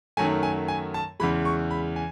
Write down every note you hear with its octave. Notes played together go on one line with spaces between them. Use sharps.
F#2 D#3 F#3 A3 G#5
G#5
G#5
A5
E2 C#3 E3 G#3 B5
C#6
B5
G#5